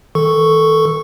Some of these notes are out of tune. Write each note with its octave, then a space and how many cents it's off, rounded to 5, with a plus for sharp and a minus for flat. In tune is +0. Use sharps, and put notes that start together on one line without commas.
D#3 +45 A4 +0 C#6 +0